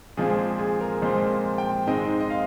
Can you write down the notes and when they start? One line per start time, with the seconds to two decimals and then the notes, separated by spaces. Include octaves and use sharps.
0.17 A#2 F3 G#3 C4 G#4
0.39 G#4
0.59 G#4
0.81 A#4
1.02 A#2 F3 G#3 C4 C5
1.58 G5
1.87 G#2 D#3 G#3 C4 D#5
2.20 D#5
2.30 F5